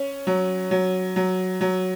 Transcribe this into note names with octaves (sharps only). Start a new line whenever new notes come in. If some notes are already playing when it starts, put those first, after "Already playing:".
Already playing: C#4
F#3
F#3
F#3
F#3